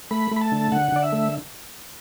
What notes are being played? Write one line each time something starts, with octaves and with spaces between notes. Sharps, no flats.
A3 B5
A3
B5
A5
D3
D3 F#5
D3 D5
E5
A3